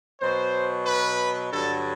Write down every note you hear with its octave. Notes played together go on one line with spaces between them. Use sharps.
B2 F#3 C5
B4
G2 D3 F#3 A4